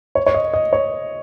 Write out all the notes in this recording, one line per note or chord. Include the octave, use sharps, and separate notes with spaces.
C#5
C#5
D#5
D#5
C#5